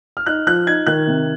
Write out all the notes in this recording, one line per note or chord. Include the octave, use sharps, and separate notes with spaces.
F6
D#4 F#6
F3 F#6
D#4 G#6
D#3 F#6
C3